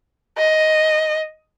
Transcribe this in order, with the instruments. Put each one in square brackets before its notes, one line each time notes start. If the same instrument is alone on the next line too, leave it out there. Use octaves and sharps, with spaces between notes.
[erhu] D#5